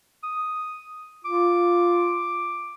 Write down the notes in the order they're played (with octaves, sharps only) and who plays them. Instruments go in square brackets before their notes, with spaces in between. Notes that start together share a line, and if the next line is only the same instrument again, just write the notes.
[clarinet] D#6
[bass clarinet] F4 [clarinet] D6